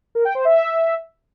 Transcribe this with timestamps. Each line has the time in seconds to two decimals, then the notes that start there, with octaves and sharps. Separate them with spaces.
0.15 A#4
0.25 G5
0.35 C5
0.45 E5